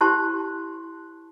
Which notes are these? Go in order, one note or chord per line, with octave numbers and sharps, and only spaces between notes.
E4 G4 C5 A5 C6